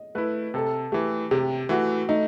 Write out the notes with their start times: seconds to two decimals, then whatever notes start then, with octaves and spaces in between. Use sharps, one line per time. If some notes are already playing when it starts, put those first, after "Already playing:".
Already playing: D#5
0.15 A3 E4 B4
0.54 C3 A4
0.92 E3 A3 G4
1.31 C3 G4
1.69 E3 A3 F#4
2.09 A3 D#4